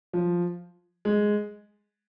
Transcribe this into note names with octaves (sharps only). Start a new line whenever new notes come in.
F3
G#3